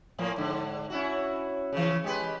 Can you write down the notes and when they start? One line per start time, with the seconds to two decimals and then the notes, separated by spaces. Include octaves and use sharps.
0.19 A2 F3 A#3
0.38 G#2 D3
0.90 C#4 E4 F#4
1.73 C#3 E3
2.04 G#3 G4 B4